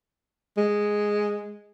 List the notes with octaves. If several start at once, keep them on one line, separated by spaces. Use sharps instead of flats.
G#3